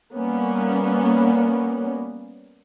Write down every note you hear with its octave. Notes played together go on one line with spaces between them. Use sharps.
G3 A#3 B3 C#4